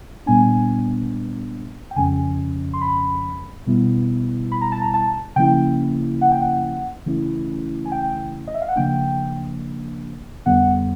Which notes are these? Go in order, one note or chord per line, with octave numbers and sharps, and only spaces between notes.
A#2 G3 B3 D4 G#5
G5
F2 C#3 F3 G#3 C#4 G#5
C6
B5
B2 G3 B3 E4
B5
A#5
A5
A#5
A5
C#3 F3 A#3 C#4 E4 G5
F#5
G5
F#5
C#3 E3 A3 C#4 E4
G#5
G5
D#5
E5
F5
F#5
C#3 F3 A#3 D4 G5
F2 D3 G3 B3 F#5